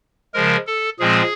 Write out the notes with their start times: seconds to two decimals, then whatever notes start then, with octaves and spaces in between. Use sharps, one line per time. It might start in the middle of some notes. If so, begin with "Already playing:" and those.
0.34 C#3 F3 G#3 A#4
0.67 A4
0.99 A#2 F3 G#3 C4 G#4